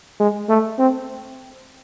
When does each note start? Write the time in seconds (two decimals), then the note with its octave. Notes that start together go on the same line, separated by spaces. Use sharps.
0.20 G#3
0.49 A3
0.79 C4